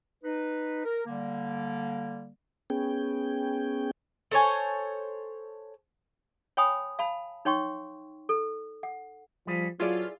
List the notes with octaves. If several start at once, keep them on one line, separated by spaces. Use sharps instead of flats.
D#4 B4
A#4
D3 G3 A#3
B3 C#4 G#4 G5
A4 C5 C#5 G#5
C#5 G5 G#5 B5 D#6
F5 A5 B5
D#4 C#5 G5 C6 C#6
A4
F#5
F3 G3 G#4
F#3 E4 F4 G#4 A4 B4 C#5 D5